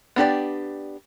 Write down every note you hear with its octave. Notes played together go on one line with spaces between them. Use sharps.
B3 D4 G4 D5